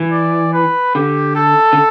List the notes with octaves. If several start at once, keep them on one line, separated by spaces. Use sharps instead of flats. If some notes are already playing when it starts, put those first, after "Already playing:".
Already playing: E3
D5
B4
D3 G4
A4
D3